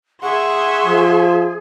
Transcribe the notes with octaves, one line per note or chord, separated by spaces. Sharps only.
G#4 E5 F#5 C6 C#6
F3